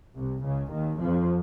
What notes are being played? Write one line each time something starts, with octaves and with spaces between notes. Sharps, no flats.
C2 C3
C#2 C#3
D#2 D#3
F2 F3